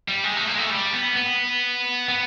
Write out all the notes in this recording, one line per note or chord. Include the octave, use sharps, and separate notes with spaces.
G3
G#3
A3
A#3
G#3
A3
G3
B3
B3
B3